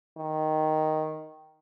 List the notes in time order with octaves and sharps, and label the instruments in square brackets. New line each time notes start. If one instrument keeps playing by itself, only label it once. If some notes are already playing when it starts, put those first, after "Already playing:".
[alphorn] D#3